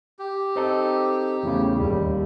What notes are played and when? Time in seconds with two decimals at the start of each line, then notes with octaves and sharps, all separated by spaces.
0.19 G4
0.56 C4 D#4 A4
1.43 E2 A2 C#3
1.80 D#2 G3